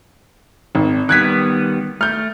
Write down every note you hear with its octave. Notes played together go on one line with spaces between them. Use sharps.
G#1
D#3 G3 B3 F#6 G#6 B6
A3 F6 G6